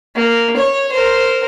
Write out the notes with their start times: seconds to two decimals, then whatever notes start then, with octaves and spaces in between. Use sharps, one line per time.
0.15 A#3
0.56 C#5
0.92 A#4 C5